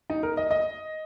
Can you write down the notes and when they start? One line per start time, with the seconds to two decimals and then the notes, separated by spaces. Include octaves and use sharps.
0.10 D#4
0.23 A#4
0.37 D#5
0.51 D#5